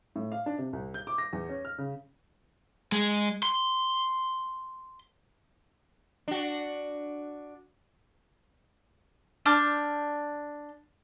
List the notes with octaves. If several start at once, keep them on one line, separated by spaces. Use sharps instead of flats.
A2
F5
D4
C3
C2
G6
D6
A#6
E2
C#4
F6
C#3
G#3
C6
D4 F#4
D4 D6 F6 G6